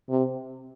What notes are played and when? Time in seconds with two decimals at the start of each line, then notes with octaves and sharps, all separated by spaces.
0.09 C3